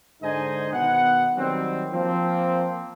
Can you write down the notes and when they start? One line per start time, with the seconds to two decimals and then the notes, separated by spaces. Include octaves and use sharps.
0.22 G#2 D3 D#4 C5 D#5 G#5
0.72 B2 D#3 B3 F#5
1.37 D#3 F#3 G3 C4
1.93 F3 A#3 C4